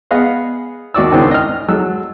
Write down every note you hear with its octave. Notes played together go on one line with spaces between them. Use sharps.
B3 G#4 D#5 F5 F#5
D#2 F#4 D5 E6
G#1 C#2 D#3 C4 D4 E4
D#5 F6
F#3 G#3 A4 E6